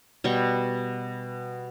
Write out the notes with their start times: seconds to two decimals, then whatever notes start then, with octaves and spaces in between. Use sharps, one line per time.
0.24 B2 G3 G5 C#6